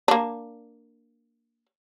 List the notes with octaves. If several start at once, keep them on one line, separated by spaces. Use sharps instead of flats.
A#3 D4